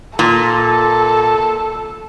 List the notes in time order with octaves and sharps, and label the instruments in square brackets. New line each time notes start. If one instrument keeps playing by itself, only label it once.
[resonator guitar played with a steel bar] A#2 [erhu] A4